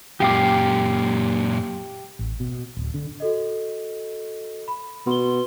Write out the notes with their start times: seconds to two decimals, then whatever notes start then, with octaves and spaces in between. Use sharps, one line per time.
0.20 F#2 A#2 G4 F5 D6
2.19 A1
2.40 B2
2.77 D1
2.94 D3
3.20 F#4 A4 D#5
4.68 B5
5.07 B2 C6 G7